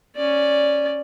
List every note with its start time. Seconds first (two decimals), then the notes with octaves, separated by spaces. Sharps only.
0.16 C#4 D5